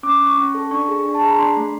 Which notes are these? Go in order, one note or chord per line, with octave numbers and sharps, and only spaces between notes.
C#4 D6
C#4
C#6
C#4
A4
D4 C#6
G#4
D4
A5
G#4 A#5
B5
D4 C6
A3